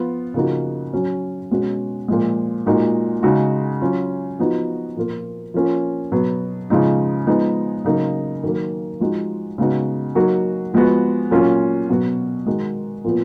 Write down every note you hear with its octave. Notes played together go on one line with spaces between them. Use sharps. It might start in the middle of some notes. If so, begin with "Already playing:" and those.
Already playing: F3 B3 F4
C#3 F3 A#3 D#4 F#4
F#3 C#4 F#4
B2 G#3 C#4 F#4
A#2 F3 G#3
A#2 G#3 D#4 F#4
C#3 G#3 D#4 F#4
F#3 C#4 F4
F3 B3 D#4 F#4
A#2 F3 A#3 F4
F3 A#3 C#4 F4
B2 F#3 B3
C#3 F3 G#3 D#4
F3 G#3 B3 D#4
C#3 F#3 A#3 D#4
D#3 F#3 A#3
F3 G#3 D#4 F#4
C#3 G#3 B3 D#4 F#4
F#3 A#3 D#4 F#4
F3 G#3 B3 F#4
A#2 F#3 C#4 F4
B2 F#3 B3 F#4
D#3 G#3 D#4 F#4
A#2 F3 B3